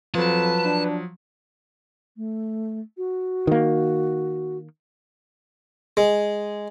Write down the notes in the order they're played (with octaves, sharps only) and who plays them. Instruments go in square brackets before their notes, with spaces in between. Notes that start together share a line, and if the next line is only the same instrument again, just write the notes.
[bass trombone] F2 [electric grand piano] F3 F#3 [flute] B4 [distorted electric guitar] A5
[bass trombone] D4
[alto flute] A3
F#4
[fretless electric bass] D#3 A#3
[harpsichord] G#3